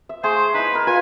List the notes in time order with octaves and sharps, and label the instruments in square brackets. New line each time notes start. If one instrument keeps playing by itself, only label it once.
[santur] E5
[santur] A3 G#4 C6 [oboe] C5
[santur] D#4 E4 [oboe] B4
[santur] A#4 B5
[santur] F4 A#4 B4 [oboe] G#5